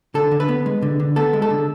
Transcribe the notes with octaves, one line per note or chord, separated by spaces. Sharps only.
D3 A4
D3
B4
B3
G#3
D3
D3
B3 A4
G#3
A4
D3